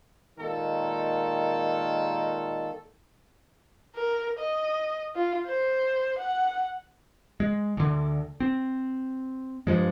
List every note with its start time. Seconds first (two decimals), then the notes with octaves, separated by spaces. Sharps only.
0.38 A#2 D#3 G#3 A#3 A4
3.95 A#4
4.39 D#5
5.15 F4
5.46 C5
6.18 F#5
7.40 G#3
7.77 D2 D3
8.40 C4
9.67 G2 F3 G#3